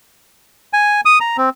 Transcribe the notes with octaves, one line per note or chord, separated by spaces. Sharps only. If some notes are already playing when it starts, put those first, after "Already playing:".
G#5
D#6
A#5
C4